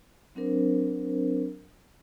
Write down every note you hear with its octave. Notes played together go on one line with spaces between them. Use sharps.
F#3 C4 D4 A#4 C5